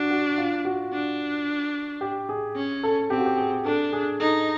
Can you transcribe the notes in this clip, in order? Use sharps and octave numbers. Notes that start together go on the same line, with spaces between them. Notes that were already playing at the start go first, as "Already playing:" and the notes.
Already playing: D4 F#4
F#4
F4
F#4
D4
G4
G#4
C#4
A4
C4 G4
F#4
G4
G#4
D4 A4
G#4
D#4 A4